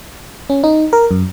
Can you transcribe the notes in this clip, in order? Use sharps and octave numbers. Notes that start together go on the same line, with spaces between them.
C#4
D#4
A#4
F#2